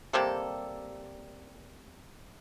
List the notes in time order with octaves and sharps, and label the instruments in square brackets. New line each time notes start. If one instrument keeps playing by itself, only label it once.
[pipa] C3 G3 A#3 A4